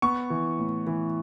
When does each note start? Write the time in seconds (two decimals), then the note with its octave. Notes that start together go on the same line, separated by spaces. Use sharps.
0.02 B3 C#6
0.30 E3
0.59 A2
0.87 E3